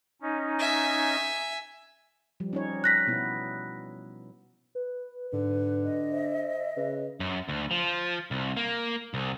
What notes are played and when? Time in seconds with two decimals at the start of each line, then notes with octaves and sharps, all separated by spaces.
0.22 C#4 D#4
0.59 E5 G#5
2.40 F3 G3
2.53 C#4 D#4 C#5
2.84 F#6 A#6 B6
3.07 B2 B3 E4
4.75 B4
5.33 G#2 D3 B4
5.83 D#5
6.12 C5 E5
6.76 C#3 B4
7.20 F#2
7.49 D2
7.71 F3
8.31 C2
8.57 A#3
9.14 C2